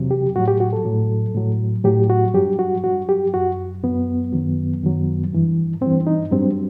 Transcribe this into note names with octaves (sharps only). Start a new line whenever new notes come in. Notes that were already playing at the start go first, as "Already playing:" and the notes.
Already playing: E2 C3 F#3
G4
A2 F#3 F#4
G4
F#4
A4
A2 F#3
A2 F#3
A2 F#3 G4
F#4
G2 F#3 G4
F#4
G2 F#3 F#4
G4
F#2 F#3 F#4
F#2 F#3 B3
F#2 D#3 F#3
F#2 D#3 F#3
G2 E3
G2 E3 C4
D#4
G2 F#3 C4